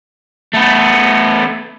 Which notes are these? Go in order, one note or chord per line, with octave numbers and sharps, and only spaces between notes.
A3 B3